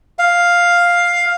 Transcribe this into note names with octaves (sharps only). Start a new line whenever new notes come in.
F5